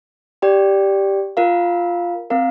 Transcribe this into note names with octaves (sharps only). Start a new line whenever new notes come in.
G4 D5 G5
F4 A#4 F5
C4 A#4 F5